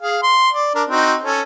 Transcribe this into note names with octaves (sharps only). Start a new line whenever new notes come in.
G#4 F5
C6
D5
D4 A#4
C4 D#4 F#4
C#4 A4